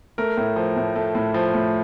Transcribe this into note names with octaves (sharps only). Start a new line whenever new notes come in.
A3 A#4
A2
F3
A2
A3
A2
F3
A2